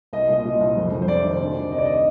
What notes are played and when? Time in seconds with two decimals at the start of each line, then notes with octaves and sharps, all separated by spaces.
0.13 C2 D#5
0.29 A#2 D#5
0.45 A#2
0.60 C2
0.77 F2
0.92 F2
1.02 C5
1.08 C3 D5
1.24 D#3
1.39 D2
1.55 D2
1.72 C3 D#5
1.78 D5
1.85 D#3 D#5